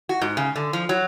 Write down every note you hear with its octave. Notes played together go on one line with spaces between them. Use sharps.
F#4
G#2
C#3
D3
F3
F#3